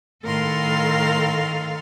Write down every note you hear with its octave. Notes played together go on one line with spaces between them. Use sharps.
A2 D#3 A4 A#4 F5 C6